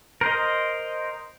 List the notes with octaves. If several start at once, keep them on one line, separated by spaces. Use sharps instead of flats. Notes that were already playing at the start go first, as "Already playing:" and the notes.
A#4 C5 D#5